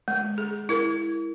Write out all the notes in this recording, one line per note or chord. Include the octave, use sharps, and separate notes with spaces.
G#3
G#4
E4 A#4